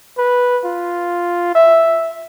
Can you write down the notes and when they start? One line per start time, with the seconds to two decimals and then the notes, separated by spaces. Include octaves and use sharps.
0.18 B4
0.64 F4
1.55 E5